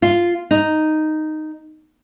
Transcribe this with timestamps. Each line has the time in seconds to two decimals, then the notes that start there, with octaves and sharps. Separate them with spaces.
0.02 F4
0.51 D#4